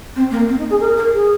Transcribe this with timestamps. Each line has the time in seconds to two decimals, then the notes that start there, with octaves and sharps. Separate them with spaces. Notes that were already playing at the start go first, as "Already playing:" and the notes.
0.16 C4
0.31 A#3
0.48 C4
0.58 D#4
0.70 G#4
0.80 A#4
0.97 A#4
1.13 G#4